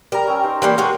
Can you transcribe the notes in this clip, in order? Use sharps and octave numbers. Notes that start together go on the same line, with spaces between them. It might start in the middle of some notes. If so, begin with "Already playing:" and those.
G3 A#4 A#5
C#4 G5 E6
D#4 C5
E3 G3 A#3 C4 F5
G#3 F#4 A#4 C#5